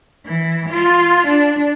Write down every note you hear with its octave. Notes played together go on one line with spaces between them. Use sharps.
E3
F4
D4